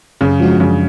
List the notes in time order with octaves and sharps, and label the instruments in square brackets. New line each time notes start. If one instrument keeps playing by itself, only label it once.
[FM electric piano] F#2 [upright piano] C#3
[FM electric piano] F3 G#3 D4 F#4
[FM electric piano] F#2 [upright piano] C#3